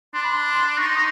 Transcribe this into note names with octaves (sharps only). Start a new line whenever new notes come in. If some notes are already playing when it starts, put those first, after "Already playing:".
D4 C6
B5
C6
D#4 C#6
C6
D#6